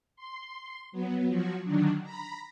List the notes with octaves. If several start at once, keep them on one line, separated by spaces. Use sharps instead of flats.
C6
F#3 B3
F3 F#3 F#4
D3 D#3 F#3 D4
A#5 B5